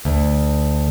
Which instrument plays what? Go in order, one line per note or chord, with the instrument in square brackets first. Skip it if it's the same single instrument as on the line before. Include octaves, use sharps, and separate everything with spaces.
[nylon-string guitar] D2